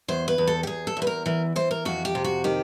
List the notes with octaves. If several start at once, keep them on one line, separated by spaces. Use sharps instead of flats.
E2 C5
B4
E2
A4
G4
E2 G#4
A4
E2
B4
A#4
E3 A#4
E3 C5
A#4
F2 F#4
G4
C3
F#4
D#3 G4